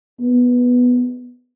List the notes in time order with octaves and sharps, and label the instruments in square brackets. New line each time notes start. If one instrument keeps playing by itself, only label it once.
[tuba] B3